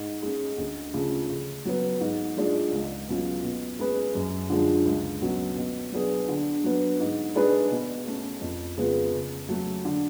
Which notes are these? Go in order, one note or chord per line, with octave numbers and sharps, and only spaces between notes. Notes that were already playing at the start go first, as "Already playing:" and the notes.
Already playing: G#2
G#3 C#4
D2
C#3 F3 A3 C#4
C#3
F#3 B3
G#2
F3 G#3 D4
C#2
B2 F#3 C#4 F4
B2
G#3 C#4 G#4 B4
F#2
D3 F3 G#3
C#2
B2 F#3 C#4 F#4
B2
F#3 B3 D4 G#4
D3
F#3 B3
G#2
G#3 D4 G#4 B4
B2
A3 C#4
F2
C#3 G#3 B3 F4
C#3
F#3 A3
D3